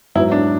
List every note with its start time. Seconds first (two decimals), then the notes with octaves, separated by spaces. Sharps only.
0.15 G#2 F#3 B3 E4
0.32 D4